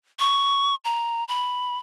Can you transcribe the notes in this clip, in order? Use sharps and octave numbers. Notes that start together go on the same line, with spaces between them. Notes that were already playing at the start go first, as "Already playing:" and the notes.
C#6
A#5
B5